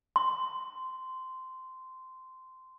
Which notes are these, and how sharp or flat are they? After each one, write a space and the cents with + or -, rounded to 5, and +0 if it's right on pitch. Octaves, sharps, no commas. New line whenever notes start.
C6 -10